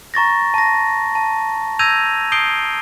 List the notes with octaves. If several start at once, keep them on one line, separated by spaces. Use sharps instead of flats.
A#5 C#6 A6 A#6
A5 A#6
A5
E6 G6 G#6 A#6 D#7 F7
D#6 G6 C7 D7 G7